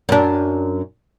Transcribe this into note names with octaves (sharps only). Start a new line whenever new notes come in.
F#2 D4